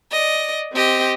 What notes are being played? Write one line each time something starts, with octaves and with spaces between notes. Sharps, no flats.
D5 D#5
C4 G4 D#5